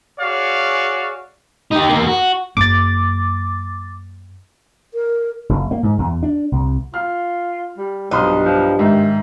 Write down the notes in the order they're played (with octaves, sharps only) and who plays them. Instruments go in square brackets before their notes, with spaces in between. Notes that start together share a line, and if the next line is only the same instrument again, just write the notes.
[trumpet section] F#4 G#4 C#5 D5 F5
[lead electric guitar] D#4 G4
E2 A#3
F#4
[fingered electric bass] F#2 A#3 [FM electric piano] D6 A6
[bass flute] A#4
[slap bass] F#1
A#3
G#2
E2
D4
C2
[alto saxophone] F4 [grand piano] F6
[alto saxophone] G3
[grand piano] B1 C6 D#6 [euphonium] G2 [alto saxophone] F3 [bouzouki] D#5
[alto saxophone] F3
[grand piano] G#2 E5 [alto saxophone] D#3